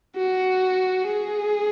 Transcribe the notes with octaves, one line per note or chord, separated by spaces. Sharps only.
F#4
G#4